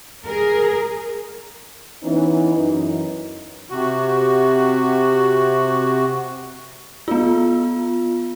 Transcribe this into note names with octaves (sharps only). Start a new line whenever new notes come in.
G#4 A#4
E3 B3 C#4 D#4
F#2 E3 D#4
C3 F#4
B3 F4